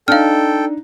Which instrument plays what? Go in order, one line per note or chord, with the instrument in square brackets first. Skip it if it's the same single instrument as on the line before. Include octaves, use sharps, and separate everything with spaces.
[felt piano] D4 D#4 [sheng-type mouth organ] A4 G5 [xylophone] F5 F6